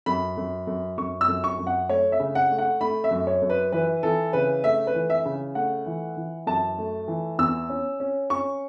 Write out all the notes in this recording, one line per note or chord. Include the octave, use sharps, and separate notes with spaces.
F#2 B5
F#2
F#2
F#2 C#6
E6
F#2
C#6
F#2
F#5
A3 C#5
E5
C#3
F#5
A3
F#5
A3 B5
E5
F#2
C#5
F#2
B4
E3 B4
E3 A4
C#3 B4
A3 E5
B4
E3
E5
C#3
A3 F#5
E3
E3
F#2 A5
A3
E3
E2 E6
C#4
C#4
C#4 C#6